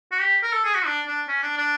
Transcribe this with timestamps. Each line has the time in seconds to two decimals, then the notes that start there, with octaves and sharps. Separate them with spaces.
0.12 F#4
0.21 G4
0.43 A#4
0.53 A4
0.64 G#4
0.75 F#4
0.86 D4
1.07 D4
1.28 C#4
1.43 D4
1.58 D4